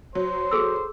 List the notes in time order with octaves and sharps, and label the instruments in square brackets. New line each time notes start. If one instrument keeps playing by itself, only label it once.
[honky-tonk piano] F#3 [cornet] C5
[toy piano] G#4 A4 E6